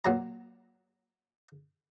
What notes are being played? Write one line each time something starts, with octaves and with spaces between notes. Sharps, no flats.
A#2 F#3 A#5